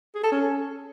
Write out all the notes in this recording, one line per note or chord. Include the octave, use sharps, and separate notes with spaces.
G#4
A4
C#4